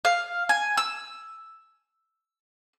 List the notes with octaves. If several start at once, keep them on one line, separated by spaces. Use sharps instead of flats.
F5
G#5
E6